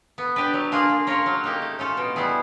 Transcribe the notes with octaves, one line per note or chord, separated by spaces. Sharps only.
B3
D4 G4 B4 D5
F#3
A#3 D4 F4 G#4
A#3
C#4 F4 A#4 C#5
F#3
A#3 D#4 G4
A3
C#4 F4 A4
B2
G3 B3 E4 G#4